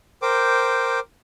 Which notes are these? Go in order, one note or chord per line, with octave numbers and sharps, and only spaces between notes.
A#4 C5 G5 D6